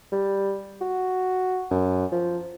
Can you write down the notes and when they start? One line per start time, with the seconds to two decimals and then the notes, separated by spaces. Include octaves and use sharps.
0.12 G3
0.81 F#4
1.71 F#2
2.12 F3